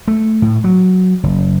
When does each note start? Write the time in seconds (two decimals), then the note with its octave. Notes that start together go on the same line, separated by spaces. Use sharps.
0.08 A3
0.42 A2
0.64 F#3
1.23 F#1